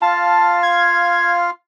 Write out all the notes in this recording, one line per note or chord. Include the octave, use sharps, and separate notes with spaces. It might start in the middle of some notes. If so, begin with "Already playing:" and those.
F4 F5 A5
G#6